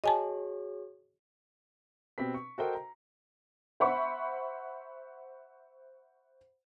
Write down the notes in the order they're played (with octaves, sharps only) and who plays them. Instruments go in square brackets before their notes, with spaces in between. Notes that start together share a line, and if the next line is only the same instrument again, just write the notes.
[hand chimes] F#4 G#4 C#5 [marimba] D#5 G#5 A5
[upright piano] B2 C4 G4 B4 B6
C#6
F#4 A4 A#4 C5 D#5 G5
A#5
[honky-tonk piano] C5 E5 F#5 B5 C#6